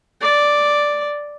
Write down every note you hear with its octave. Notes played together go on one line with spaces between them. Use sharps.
D5